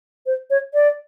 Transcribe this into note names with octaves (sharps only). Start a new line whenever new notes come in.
C5
C#5
D5